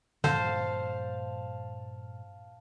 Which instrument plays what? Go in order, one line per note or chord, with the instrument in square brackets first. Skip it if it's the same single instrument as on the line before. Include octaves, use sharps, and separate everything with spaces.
[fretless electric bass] G2 A#2 F3 [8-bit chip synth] D3 [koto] C5 [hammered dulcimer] F5 A5